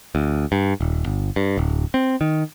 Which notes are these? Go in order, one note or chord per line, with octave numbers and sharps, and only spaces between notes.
D2
G2
D#1
G1
G2
D1
C4
D#3